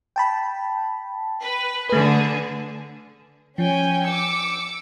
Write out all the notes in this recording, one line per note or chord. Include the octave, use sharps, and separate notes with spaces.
G5 A5 B5
B4
D3 A3 G#4 B4
F3 C#4 G5 G#5
D6 E6 C#7